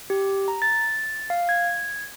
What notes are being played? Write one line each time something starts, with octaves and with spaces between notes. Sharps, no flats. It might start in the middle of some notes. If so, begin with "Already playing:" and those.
G4
A#5
A6
F5
G#6